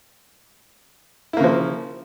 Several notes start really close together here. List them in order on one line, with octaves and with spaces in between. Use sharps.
E4 A#3 C#3 F3